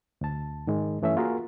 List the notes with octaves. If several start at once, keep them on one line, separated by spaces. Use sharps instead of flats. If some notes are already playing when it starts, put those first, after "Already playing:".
D2 A5
G#2 D#3 G#3
G2 E3 A3 C#4 E5
A#3 F4 F#4 G#4 A#4